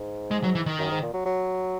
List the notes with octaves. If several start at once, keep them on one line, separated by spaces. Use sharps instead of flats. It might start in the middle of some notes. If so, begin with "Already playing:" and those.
Already playing: G#2
G#3
F#3
E3
D#3
F#2
G#2
A#2
F#3
F#3